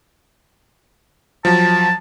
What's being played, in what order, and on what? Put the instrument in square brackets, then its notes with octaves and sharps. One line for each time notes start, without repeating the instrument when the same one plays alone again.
[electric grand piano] F3 F#3 [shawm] A5